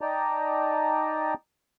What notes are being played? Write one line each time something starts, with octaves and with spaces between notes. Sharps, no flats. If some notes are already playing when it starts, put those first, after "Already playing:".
D#4 D5 D#5 G5 A5 A#5